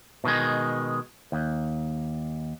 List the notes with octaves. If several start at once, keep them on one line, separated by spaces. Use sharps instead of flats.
B2 D#3 G#3
D#2